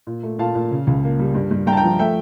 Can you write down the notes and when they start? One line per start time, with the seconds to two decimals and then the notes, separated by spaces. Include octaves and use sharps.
0.07 A#2
0.23 A3
0.39 A#2 F5 A5
0.55 A#2
0.71 C#3
0.87 C#2
1.04 A#3
1.19 G3
1.34 G2
1.51 G2
1.67 G2 G5 A#5
1.72 A5
1.77 G5 A#5
1.83 F3
1.99 A3 E5 G5